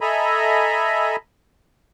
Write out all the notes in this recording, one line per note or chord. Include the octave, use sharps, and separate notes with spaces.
A4 D#5 E5 G#5 A#5 B5